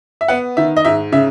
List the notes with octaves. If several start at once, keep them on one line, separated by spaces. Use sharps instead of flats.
E5
B3 F#5
D#3 E5
D#5
G#2 E5
C#3 E5